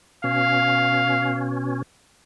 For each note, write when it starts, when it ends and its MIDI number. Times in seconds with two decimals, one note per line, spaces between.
0.24 1.82 47
0.24 1.82 61
0.24 1.58 77